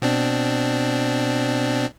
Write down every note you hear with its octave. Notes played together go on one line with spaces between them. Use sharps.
B2 C4 D4